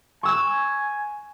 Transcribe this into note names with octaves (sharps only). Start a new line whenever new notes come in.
G#5 C#6 E6 F#6